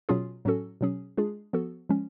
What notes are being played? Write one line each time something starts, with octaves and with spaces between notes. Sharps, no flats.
B2 F#3 C#4 F4 G#4
A2 F#3 C#4 F#4 A4
B2 F#3 C#4 G#4
G#3 D4 F4 G#4
F3 B3 F#4 A4
F3 G#3 C#4